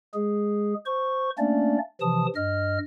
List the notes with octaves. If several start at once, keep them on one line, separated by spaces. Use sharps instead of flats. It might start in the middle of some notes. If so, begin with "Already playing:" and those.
G#3 G#4
C5 C#6
A3 A#3 C#4 D4 D5
C3 E3 F3 A5 D#6
G2 D#5 F6